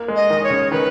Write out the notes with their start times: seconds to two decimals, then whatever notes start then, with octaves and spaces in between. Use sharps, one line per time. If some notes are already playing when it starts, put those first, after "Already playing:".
Already playing: A#3
0.08 G#3
0.16 D#5
0.30 D#3
0.44 C#5
0.50 C#3
0.71 D#3 B4